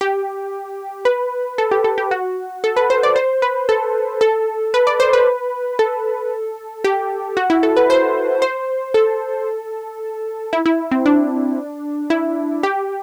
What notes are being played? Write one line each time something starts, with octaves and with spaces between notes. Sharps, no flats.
G4
B4
A4
G4
A4
G4
F#4
A4
B4
C5
D5
C5
B4
A4
A4
B4
D5
C5
B4
A4
G4
F#4
E4
A4
B4
C5
C5
A4
E4
E4
C4
D4
E4
G4